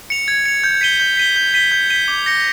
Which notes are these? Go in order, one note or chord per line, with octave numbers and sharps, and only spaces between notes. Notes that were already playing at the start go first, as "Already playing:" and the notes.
C#7 F7
G#6
C#7 F7
G6
B6 D#7 G7
G6
B6 D#7 G7
G6
B6 D#7 G7
G6
B6 D#7 G7
D6
G6 A#6 C#7